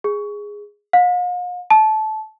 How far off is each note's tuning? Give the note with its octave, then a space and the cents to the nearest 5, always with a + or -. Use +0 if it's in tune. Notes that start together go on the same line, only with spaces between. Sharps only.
G#4 -10
F5 +45
A5 -20